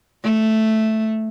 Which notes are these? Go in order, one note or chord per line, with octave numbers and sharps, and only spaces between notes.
A3